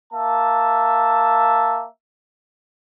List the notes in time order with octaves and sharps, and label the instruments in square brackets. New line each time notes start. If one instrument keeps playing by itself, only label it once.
[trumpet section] A#3 E5 A5